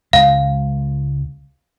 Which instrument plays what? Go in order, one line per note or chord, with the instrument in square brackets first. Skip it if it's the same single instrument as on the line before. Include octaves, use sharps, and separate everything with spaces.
[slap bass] C#2 G#3 [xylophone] F5